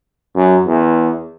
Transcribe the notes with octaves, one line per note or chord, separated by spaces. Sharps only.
F#2
E2